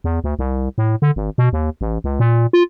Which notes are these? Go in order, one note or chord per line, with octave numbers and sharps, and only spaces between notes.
E2
D2
C2
A2
D3
G#1
B2
D#2
A1
C#2
A#2
F4